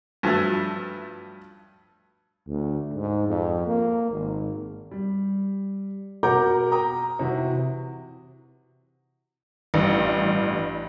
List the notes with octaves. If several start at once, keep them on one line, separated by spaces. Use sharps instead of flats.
G2 F3 F#3 A3
D2
G#2
F2
A#3
G#1
G3
B2 A#4 F#5 A#5 D6 G6
G5 A#5 D#6
C3 E3 E4 F#4
A1 G2